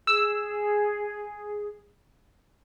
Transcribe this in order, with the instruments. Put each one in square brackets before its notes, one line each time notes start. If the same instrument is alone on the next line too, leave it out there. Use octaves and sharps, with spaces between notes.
[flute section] G#4 [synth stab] E6